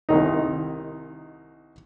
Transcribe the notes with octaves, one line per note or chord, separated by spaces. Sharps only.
C2 D#3 D#4